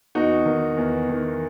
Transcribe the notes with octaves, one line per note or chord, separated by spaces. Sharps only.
E2 D#4 F#4
D#3
E2
D#3